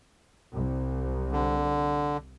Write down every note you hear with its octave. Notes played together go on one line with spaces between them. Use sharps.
C2
D3